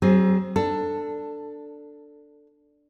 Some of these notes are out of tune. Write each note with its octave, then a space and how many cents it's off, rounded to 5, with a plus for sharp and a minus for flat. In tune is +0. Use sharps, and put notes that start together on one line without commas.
F#3 +40 C4 +15 G#4 +0
D4 +0 A4 +15